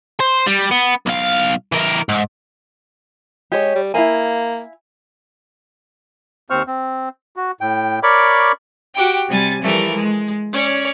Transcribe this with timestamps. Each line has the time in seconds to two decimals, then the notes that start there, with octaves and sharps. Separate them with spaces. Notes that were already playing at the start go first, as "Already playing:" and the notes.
0.20 C5
0.47 G3
0.71 B3
1.06 B1 F5
1.72 E3 A#4
2.09 G#2
3.52 G#3 G4 C#5
3.75 G3
3.94 A#3 E4 F5 G#5
6.50 D#2 C4 C5 C#6 F6
6.67 C4
7.36 F#4
7.61 A2 G5
8.03 A#4 C#5 D5 B5 C#6 D6
8.95 F#4 G4 G5
9.28 C3 G3 G#5 A6
9.62 E3 F3 G3 A3 A#4
9.93 G#3
10.52 C#4 C#5 D5